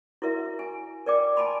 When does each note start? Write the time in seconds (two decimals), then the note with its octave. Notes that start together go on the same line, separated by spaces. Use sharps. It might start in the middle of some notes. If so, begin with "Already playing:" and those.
0.22 E4 F#4 A#4 E5
0.59 G#5
1.06 A#4 D5 G5 D6
1.37 G#5 A5 B5 C6